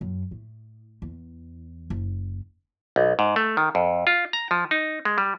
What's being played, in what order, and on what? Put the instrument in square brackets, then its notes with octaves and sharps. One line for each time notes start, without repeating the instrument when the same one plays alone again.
[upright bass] F#2
A2
E2
F#1
[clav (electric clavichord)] B1
G#2
A3
D#3
F2
F4
A#5
F3
D#4
G#3
G3